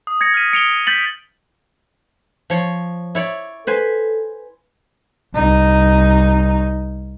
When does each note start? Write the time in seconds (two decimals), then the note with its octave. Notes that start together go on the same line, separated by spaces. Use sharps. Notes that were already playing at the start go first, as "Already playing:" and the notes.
0.07 D#6
0.21 G#6 A#6 C#7
0.34 F6 B6 D#7
0.53 C#7 D7 F7 G7
0.69 F7
0.87 G6 A6 B6 F#7
2.50 F3 C#5
3.15 E4 C#5 D5
3.67 A4 B4 C5 G#5
5.34 C2 D#4